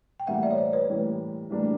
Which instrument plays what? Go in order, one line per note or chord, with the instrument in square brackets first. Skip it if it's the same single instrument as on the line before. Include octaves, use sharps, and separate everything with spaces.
[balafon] G5
[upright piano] A2 E3 G3 A#3 [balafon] E5 F#5
[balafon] D5 E5
C#5
C5 D5
B4 C#5
[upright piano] A2 E3 G3 A#3
A2 E3 G3 A#3 D4